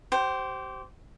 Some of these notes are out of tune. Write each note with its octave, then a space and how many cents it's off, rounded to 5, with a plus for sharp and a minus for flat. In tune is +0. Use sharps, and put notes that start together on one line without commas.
G4 -30 C5 +0